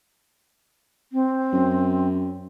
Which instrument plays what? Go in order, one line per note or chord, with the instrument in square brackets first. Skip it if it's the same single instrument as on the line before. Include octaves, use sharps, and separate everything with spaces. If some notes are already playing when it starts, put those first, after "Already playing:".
[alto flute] C4
[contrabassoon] F#2